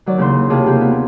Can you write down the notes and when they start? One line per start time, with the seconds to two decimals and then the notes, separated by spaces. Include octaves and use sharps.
0.06 D#3 F#3 D5
0.18 D#2 C#3 E3 E4 C6
0.50 D#2 C3 F4 G#4 A5 D6
0.66 A#3 C4 G4 G#4
0.81 B3